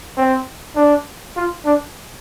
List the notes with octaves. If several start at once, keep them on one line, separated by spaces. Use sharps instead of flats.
C4
D4
F4
D4